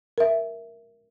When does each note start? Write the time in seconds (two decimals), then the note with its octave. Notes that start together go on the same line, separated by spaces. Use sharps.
0.18 A#4 E5